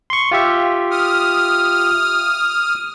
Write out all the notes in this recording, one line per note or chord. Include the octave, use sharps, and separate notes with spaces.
C6 C#6
F4 G4 E5
D#6 F6